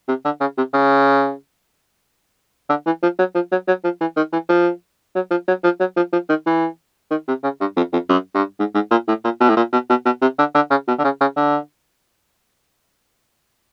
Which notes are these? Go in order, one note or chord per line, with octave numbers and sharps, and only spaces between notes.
C3
D3
C#3
C3
C#3
D3
E3
F3
F#3
F3
F#3
F#3
F3
E3
D#3
E3
F3
F#3
F3
F#3
F3
F#3
F3
F3
D#3
E3
D#3
C3
C#3
G2
F2
F2
F#2
G2
G#2
G#2
A#2
A2
A#2
B2
A2
A#2
B2
B2
B2
C3
D3
D3
C#3
B2
D3
C#3
C#3
D3